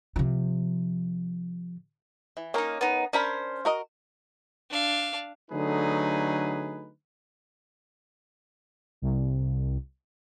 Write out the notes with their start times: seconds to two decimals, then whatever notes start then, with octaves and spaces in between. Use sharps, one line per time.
0.16 C3 F3
2.37 E3
2.54 A#3 C#4 D#4 A#4
2.81 B3 D#4
3.13 C#4 D4 A#4 C5 B5
3.65 F#4 A#4 D#5
4.70 D4 F5
5.51 D3 F#3 A3 D#4 G#4 B4
9.02 C2